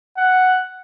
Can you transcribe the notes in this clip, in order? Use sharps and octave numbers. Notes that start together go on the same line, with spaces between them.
F#5